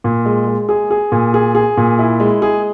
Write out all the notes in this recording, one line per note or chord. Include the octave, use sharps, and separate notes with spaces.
A#2
G#3
G#3
G#4
G#4
A#2
G#4
G#4
A#2
E4
G#3
G#4